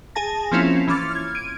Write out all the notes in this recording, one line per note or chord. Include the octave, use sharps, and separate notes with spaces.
G#4 G#5 A5 A#6
F3 A#3 C4 C#4 E4 F4
E3 C#4 C6 D6 F6 A6
F6 G#6
G#6 D7 D#7